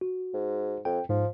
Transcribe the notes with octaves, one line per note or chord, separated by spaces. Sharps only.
F#4
G#2
F2 G5
G#2 F3